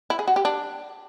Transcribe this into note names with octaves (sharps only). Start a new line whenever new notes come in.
E4
G#4
F#4
G4
D4